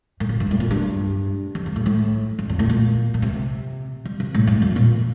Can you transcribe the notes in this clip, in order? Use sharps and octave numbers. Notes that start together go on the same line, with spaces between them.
A2
A#2
G2
A2
A#2
G2
F2
G2
A2
A2
G2
F2
A2
A#2
A#2
C3
G3
C3
A2
G2
F2
A#2